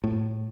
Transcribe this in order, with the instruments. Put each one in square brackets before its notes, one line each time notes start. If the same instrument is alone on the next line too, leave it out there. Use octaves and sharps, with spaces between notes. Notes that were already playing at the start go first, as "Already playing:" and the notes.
[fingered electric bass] A2